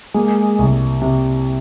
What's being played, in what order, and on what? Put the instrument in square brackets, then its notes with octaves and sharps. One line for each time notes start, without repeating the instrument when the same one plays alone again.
[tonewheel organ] G#3 [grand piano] A#3
[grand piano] C2
C3